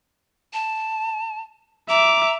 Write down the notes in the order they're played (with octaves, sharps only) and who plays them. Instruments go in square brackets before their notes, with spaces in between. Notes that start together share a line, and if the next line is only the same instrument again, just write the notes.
[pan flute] A5
[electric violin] E5 D6 [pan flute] A#5